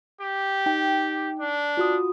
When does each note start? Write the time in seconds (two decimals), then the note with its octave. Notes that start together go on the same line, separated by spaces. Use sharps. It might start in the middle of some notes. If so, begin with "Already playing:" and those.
0.21 G4
0.66 D#4 G5
1.40 D4
1.77 F4 F#4 D#6